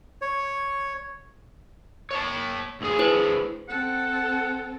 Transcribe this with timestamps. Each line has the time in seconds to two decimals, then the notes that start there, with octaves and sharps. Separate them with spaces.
0.22 C#5
2.11 C#5 A5
2.81 D2 G#4
2.99 E4 B4 C5
3.69 C4 A4 F#5